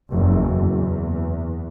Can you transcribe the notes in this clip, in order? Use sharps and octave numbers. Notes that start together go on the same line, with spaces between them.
F#1 E2
E2